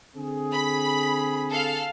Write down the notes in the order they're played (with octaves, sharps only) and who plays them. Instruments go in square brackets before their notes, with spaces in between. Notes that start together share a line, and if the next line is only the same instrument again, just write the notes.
[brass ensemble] D3 C4 G#4
[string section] B5
A4 F5